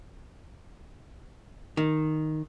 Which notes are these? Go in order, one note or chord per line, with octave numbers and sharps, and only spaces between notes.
D#3